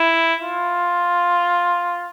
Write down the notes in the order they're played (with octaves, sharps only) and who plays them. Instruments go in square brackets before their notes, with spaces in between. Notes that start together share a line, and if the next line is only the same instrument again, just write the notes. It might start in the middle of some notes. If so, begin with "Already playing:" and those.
Already playing: [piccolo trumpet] E4
F4